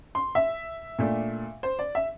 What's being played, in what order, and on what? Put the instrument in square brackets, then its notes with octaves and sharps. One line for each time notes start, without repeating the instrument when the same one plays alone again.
[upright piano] C6
E5
A#2 A3 D4
C5
D5
E5